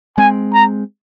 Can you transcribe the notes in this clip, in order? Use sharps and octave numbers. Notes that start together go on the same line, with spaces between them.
G#3 C4 G#5
A#5